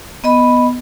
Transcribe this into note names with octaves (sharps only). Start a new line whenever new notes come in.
B3 D#5 B5